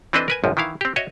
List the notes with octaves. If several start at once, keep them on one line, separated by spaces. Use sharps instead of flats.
E3 C4 D4 A4 B4 D#5
A#4 B4 G#5
G#1 C#2 F#2 F3
D#3 E3 E4 F5
C4 G4
F#4 C#5 D#5 E5